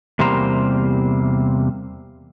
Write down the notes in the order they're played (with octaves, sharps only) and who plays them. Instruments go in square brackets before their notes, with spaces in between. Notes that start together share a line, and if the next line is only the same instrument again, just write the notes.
[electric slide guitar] E2 C3 G3 A#3 C5 A#5